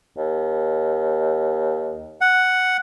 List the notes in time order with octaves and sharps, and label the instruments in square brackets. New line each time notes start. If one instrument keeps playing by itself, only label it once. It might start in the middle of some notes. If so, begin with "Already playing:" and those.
[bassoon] D#2
[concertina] F#5